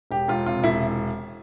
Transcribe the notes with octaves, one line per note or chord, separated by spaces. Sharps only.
E1 G4
E1 F4
C3 F4
E1 E4